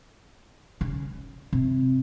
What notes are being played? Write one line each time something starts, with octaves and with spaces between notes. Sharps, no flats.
C#3
C3